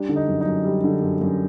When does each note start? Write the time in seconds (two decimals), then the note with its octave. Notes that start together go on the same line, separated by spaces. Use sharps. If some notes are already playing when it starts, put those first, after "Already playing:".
Already playing: G3 D4
0.09 D3
0.16 D#4
0.28 F#2
0.41 D#4
0.46 F#2
0.64 G3
0.84 D3
1.02 F#2
1.21 F#2